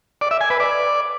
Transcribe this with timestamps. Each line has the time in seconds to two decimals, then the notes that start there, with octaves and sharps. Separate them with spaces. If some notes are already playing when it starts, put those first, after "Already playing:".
0.21 D5
0.31 E5
0.41 G#5
0.50 B4
0.60 D5